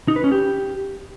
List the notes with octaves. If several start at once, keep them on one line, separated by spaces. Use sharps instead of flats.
D#4
B4
C#4
G4